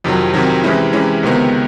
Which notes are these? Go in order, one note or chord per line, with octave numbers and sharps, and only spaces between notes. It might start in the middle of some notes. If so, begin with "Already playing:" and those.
F2 C3 D#3 F#3
F2 C3 D#3 F#3
C3 E3 G#3 C#4 E4
C3 E3 G#3 C#4 E4
C#2 C3 D#3 G#3 B3